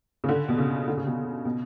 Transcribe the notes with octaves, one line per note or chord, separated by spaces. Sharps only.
C#3
D3
B2
C#3
D3
C#3
B2
B2